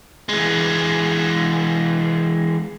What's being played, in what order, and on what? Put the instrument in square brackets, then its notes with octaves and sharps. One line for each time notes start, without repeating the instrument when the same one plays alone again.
[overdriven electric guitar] E3 G#3